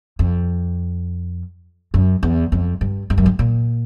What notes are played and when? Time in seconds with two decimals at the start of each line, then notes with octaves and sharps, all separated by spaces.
0.19 F2
1.94 F#2
2.23 E2
2.52 F2
2.81 G2
3.10 G2
3.18 F#2
3.26 G2
3.39 A#2